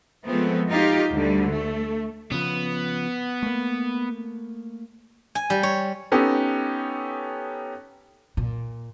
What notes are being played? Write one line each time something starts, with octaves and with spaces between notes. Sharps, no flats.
F3 G#3 A3 B3 C4
D#4 F4 G4 F5
D2 D3 G3
A3
C#3 F3 B3
A3 A#3
G#5
G3
C#5
B3 C#4 D#4 G4 A4
A#2